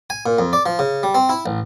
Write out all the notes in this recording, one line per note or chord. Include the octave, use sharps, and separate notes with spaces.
G#5
A#2
F2
D5
F3
C#3
G3
C4
E4
A1